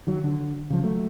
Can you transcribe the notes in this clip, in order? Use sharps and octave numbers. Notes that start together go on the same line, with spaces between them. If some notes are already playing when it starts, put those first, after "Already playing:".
D#3 F#3
D3
C#3 F3
F#3 A3